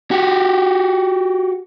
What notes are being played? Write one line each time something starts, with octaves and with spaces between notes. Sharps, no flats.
F#4 G4